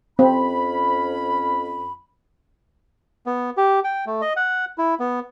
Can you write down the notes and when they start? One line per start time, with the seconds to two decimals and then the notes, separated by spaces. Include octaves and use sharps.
0.19 F2 C4 C#4 B5
3.26 B3
3.57 G4
3.84 G5
4.06 A3
4.21 D#5
4.36 F#5
4.78 E4
5.00 B3